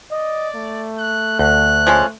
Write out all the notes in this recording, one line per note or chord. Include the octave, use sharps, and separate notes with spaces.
D5 D#5
A3
F#6
D2 F#6
F3 G#3 C#4